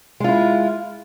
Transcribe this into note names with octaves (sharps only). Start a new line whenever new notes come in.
G#3 E4 F4